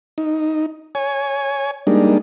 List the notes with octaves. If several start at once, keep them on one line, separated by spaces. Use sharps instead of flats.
D#4
C#5 G#5
G3 G#3 A#3 D4 D#4